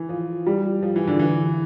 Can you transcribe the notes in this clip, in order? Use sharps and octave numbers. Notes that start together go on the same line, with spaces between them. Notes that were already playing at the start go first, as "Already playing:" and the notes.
Already playing: E3
F3
G3
F3
E3
D3
E3